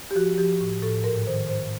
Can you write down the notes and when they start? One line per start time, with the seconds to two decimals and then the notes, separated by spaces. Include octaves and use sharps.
0.11 G4
0.15 F3 F#4
0.38 F3 G4
0.61 A2
0.82 A2 A4
1.04 G#2 A#4
1.27 D#3 C5
1.49 G#2 C5